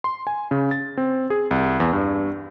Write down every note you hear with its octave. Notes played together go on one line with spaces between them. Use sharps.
C6
G#5
C#3
A6
C4
G#4
C2
E2
G2